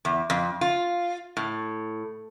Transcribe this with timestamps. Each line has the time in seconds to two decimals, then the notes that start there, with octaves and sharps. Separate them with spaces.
0.05 E2
0.30 F2
0.61 F4
1.37 A2